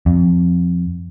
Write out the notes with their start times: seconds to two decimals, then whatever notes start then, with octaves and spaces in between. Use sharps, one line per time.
0.06 F2